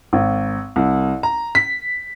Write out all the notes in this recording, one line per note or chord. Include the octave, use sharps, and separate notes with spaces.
G#1
C2
A#5
B6